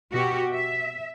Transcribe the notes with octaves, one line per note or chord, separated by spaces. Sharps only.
B2 F#4 G4
E5